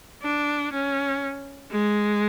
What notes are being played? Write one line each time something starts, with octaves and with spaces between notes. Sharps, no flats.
D4
C#4
G#3